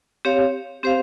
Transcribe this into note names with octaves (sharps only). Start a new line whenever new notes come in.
C4 G4 C#5 F5
C4 G4 C5 F5